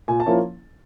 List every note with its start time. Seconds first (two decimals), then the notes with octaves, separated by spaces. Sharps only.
0.08 A#2 G#5
0.20 A5
0.26 F3 A#3 C#4 E4